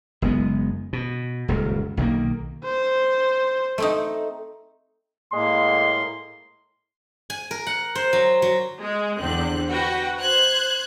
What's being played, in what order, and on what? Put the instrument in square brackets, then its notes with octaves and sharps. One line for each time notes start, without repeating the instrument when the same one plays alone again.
[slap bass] F#1 G#3 B3
B2
D#1 C#2 F#2
B1 D#3 F3 A#3
[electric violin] C5
[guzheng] A3 C4 D#4
[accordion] A2 A#3 [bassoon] G#3 [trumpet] C6
[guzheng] G#5
A#4
F#5
C5
F#3
F#3
[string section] G#3
E2 D3 C4 F#6
F#4 B4 G5
C5 F#6 G#6